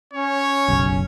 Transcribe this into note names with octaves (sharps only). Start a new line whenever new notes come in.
C#4 C#5
F#1 B1